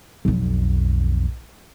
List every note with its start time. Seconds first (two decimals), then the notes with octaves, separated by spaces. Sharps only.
0.25 B1 F2